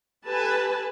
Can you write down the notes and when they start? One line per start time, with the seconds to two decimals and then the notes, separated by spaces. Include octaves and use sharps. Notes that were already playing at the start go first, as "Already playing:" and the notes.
0.25 G4 A4 B4 G#5 A5